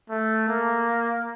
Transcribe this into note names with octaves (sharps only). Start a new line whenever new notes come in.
A3
A#3